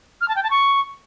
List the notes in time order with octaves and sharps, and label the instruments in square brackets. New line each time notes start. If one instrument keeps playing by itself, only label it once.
[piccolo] F6
A5
G5
A5
C#6